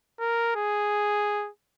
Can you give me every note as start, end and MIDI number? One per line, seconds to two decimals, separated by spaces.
0.20 0.55 70
0.56 1.49 68